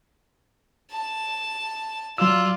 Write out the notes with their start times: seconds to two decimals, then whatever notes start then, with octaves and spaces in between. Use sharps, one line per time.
0.91 A5
2.18 F#3 F4 D5 E6